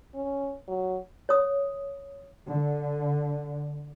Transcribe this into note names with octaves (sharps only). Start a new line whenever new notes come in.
C#4
F#3
C#5 D#6
D3